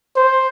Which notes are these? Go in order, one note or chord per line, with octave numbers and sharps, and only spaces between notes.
C5